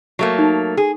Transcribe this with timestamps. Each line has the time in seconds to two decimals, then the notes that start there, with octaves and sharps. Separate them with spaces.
0.19 F#3 A3 A#3
0.38 D#4
0.77 G#4